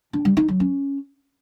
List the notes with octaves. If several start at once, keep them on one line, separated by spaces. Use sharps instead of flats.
D4
G3
D#4
F#3
C#4